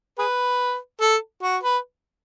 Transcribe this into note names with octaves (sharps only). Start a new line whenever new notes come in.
G#4 B4
A4
F#4
B4